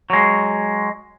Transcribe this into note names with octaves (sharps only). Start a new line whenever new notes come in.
F#3 G#3